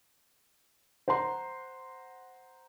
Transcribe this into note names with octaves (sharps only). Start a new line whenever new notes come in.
C5 F#5 A#5 C6